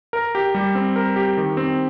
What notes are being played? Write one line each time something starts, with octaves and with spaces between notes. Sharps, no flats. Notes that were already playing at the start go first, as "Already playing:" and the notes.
A#4
G4
G3
C4
A#4
G4
D#3
C4